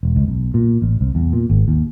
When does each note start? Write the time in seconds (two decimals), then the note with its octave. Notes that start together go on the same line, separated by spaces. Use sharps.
0.03 E1
0.16 C#2
0.28 B1
0.54 A#2
0.82 A1
1.01 C2
1.15 E2
1.33 A#2
1.50 G#1
1.68 D#2